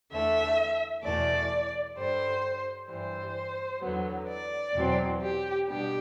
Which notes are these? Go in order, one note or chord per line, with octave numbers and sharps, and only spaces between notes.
E2 D3 A3 E5
E2 B2 A3 D5
G2 D3 G3 C5
G2 E3 G3 C5
E2 D3 F#3 B3
D5
E2 B2 F#3 C4
G4
B2 G3 B3 D4 G4